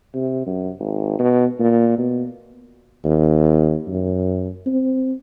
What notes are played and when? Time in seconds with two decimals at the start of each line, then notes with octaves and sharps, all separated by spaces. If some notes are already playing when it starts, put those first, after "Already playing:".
0.14 C3
0.47 F#2
0.79 G#1
1.19 B2
1.60 A#2
1.98 B2
3.04 D#2
3.87 F#2
4.66 C4